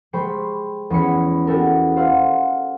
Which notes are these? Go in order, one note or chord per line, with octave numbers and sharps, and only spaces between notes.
G3 G#3 C5 G5 B5 C#6
E2 C#4 B5 C#7
B3 F#4 G4 A4 A#4
C5 F5 F#5 F6